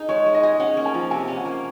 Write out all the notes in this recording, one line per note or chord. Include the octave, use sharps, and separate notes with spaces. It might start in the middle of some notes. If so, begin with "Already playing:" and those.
Already playing: D#4 G#4
G#3 C#5
G#3
D#5
G#4
C#4 F#5
A#3
G#5
F3
C3 G#5
C#4
F#5
A#3